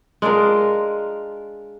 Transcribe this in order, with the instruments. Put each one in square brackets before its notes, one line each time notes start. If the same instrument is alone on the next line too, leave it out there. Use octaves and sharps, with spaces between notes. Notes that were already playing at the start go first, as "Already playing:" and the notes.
[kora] G#3 D4 F4 A#4